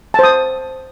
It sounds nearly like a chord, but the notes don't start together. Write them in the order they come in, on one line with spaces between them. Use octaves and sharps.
A5 C5 D#6